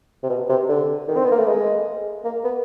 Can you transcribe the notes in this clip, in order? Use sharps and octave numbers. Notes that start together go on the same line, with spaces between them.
C3
B2
C3
D3
D#3
C4
B3
A#3
A3
G#3
A#3
B3